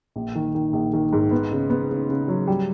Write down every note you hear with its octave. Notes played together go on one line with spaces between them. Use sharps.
A#1
D#3
D#3
A#1
D#3
G#2
B3
C#3
B3
C#3
C#3
F#3
G3